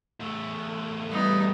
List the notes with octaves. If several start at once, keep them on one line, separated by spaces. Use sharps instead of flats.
E2 A3
G3 B3 D#4